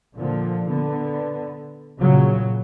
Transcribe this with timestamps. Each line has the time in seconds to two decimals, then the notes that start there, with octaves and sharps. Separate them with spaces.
0.17 A#2 D3 F3
0.69 D3 B3
2.00 A#2 C#3 F#3